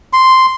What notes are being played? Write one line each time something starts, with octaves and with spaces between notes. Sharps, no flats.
C6